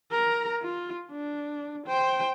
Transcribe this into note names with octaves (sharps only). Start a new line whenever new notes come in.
A#4 A#5
F4
D4
C5 G5